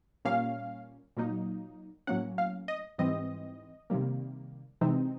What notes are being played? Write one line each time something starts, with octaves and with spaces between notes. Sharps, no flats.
A#2 G3 A#3 C#4 F5
A#2 F#3 A#3 D#4
A2 F#3 A#3 C#4 F#5
F5
D#5
G#2 E3 G3 C4 D#5
C3 D#3 G3 A#3
C3 E3 G#3 C4 D#4